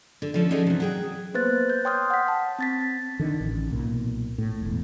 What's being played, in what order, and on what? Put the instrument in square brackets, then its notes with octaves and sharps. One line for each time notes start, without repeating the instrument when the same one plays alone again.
[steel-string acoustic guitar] D3
D3 F3 C#4 A4
C#4 D#4 F#4 G#4 A4 D5
C3 E3
F#3 G#4 G5
[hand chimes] A#3 B3 B4 C5 F#6 A6
G6
C#5 G5 C6 D#6 F6 G6
F#5 B6
A5
C4 A6 B6
[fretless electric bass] D3 D#3
A1
B1 A#2
A2
E1 E2